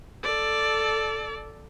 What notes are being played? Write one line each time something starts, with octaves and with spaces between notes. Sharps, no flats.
A4 D5